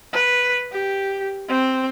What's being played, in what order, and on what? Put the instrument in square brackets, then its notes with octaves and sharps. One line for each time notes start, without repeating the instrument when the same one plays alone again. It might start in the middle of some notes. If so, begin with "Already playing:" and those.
[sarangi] B4
G4
C4